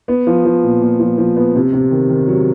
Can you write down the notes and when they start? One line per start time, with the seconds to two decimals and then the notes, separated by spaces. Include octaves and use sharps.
0.08 B3
0.27 F3
0.45 F3
0.63 A#2
0.81 A#2
1.00 F3
1.18 F3
1.36 B3
1.55 C3
1.73 C3
1.91 D#3
2.09 D#3
2.28 F#3